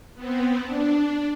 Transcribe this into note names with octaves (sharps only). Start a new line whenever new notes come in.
B3 C4
D4